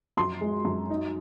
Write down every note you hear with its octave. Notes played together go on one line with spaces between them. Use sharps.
F#2 C6
G#3
F#2
D#4